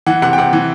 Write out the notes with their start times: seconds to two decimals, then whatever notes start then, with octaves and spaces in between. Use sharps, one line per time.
0.06 E3 F#5
0.22 C3 F#5
0.33 G5
0.38 C3 F#5
0.53 E3